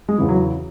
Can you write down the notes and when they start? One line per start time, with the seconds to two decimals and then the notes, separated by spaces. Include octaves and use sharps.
0.09 G#3
0.18 E2 C#3 E3
0.29 F#3